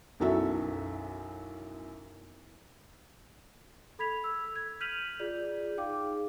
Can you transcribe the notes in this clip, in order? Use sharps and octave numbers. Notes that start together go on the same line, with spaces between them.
B1 F#2 E3 F#4 A4 E5
A4 B5 G#6 B6 F7
E6
G#6
F6 G6 B6 D#7 F7 F#7
F4 G#4 D5 G6
D#4 G#4 F5 G5 D6